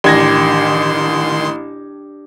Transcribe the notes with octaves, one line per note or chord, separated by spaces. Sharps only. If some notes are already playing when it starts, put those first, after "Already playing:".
A1 D#3 D4 G4 C6 G#6 A#6